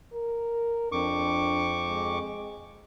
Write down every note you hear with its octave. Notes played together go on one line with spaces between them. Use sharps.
A#4
F2 D4 C#6 D6
G#3